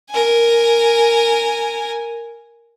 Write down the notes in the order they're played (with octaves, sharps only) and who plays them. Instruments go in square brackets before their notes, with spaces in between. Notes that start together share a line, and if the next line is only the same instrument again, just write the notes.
[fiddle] A#4 G#5